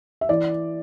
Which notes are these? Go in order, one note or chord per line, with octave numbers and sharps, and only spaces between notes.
E5
E3 D5